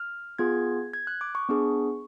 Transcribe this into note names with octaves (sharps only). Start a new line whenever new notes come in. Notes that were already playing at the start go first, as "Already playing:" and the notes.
Already playing: F6
B3 F4 G#4 G#6
G#6
F#6
D6
C#6
B3 D4 G#4